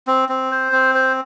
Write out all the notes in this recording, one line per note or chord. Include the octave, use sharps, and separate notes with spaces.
C4
C4
C5
C4
C5